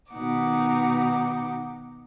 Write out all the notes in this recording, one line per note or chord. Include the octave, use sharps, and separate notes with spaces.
B2 D#3 D#4 F#5 D6